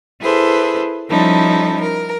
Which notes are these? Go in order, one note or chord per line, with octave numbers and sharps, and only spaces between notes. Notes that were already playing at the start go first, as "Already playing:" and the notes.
E4 G#4 A4 B4 C5
F3 G3 C#4 D#4 E4 A4
A#4